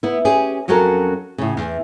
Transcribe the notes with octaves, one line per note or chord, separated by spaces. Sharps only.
B3 E4
C#4 G4 G#4
F2 F#3 C#4 F#4 A4 A#4
A2 C#3
E2